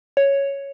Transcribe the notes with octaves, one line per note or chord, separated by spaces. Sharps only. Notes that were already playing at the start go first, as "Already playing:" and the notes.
C#5